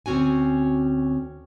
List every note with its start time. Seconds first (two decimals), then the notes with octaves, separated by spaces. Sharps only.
0.06 D2 C4 C#4 F#4 G#5